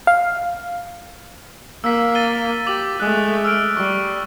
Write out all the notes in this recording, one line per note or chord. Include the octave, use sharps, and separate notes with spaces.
F5
A#3 E6 B6
A6 D#7 G7
G4 D6 A6 F#7
G#3 A3 D#6 F#6
E6 F6 D7
G3 C#6